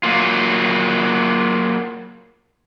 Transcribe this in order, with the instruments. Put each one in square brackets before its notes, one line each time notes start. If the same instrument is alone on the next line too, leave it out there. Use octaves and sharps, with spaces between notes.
[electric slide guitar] F#3 A#3 F4